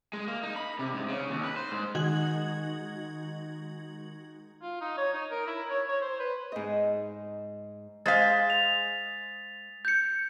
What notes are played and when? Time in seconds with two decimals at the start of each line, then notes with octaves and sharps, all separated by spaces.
0.13 G#3
0.28 A#3
0.43 D#4
0.56 B5
0.79 C3
0.94 G#2
1.09 C#3
1.30 D#2
1.44 B4
1.57 C5
1.72 G#2
1.95 D#3 G#3 D#4 F#4 G#6 F#7
4.62 F4
4.81 D#4
4.98 C#5
5.13 D#4
5.31 A#4
5.47 E4
5.70 C#5
5.89 C#5
6.02 C5
6.20 B4
6.52 G#2 D#5
8.06 G#3 C5 F5 A6 B6
8.50 F7
9.85 G6 C#7